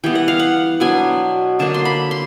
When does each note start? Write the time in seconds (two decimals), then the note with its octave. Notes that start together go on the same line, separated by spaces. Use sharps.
0.04 E3 G3 B3 G5
0.15 F#5
0.28 F5
0.39 F#5
0.80 B2 F#3 B3 D4 G#5
1.59 D3 F#3 A#3 D4 A5
1.74 C6
1.85 B5
2.11 C6